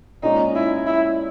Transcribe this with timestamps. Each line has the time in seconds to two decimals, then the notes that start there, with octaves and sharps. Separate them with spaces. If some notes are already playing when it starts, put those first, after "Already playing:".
0.23 A#2 G#3 C#4 D#4
0.55 E4
0.87 E4